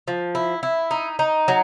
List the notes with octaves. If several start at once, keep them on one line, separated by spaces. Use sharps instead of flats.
F3
E4
E4
D#4
D#4
F#3